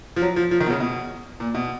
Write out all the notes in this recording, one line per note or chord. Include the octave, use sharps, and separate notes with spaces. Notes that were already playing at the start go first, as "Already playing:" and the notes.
F3
F#3
F3
F3
D#3
B2
C#3
B2
A#2
B2